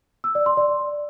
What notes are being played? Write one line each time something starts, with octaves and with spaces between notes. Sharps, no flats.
E6
D5
C6
D5